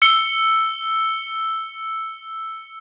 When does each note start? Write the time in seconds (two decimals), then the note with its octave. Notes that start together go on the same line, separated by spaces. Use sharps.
0.02 E6 C#7 G7